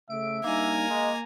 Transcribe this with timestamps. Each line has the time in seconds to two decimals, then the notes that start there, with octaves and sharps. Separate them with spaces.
0.10 C#3 A3 E5 D7
0.44 G3 A#3 D4 D#4 G#5 A#5
0.90 G#3 D#5